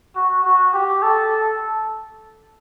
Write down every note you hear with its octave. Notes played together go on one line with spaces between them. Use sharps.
F#4
F#4
G4
A4